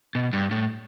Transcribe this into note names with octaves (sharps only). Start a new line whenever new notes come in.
B2
G2
A2